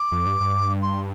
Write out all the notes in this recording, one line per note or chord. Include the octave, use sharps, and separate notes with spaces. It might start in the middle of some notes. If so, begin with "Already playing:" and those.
Already playing: D6
F2
G2
G2
C6